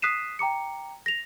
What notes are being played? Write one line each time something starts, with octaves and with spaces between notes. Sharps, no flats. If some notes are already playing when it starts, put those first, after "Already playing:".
D#6 F#6 B6 C7 D#7 E7
G5 A#5 D6 C#7
A#6 F7